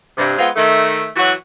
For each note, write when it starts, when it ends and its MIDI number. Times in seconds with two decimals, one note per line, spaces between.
0.18 0.32 43
0.18 0.32 48
0.37 0.49 56
0.37 0.49 59
0.37 0.49 60
0.37 0.49 65
0.56 1.06 51
0.56 1.06 57
1.16 1.32 52
1.16 1.32 54
1.16 1.32 66